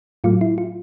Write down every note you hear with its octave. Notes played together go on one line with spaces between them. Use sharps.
A2 F#3 A3 F4
E4
F4